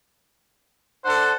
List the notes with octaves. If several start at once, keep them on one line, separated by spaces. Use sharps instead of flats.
D4 A4 C5 F#5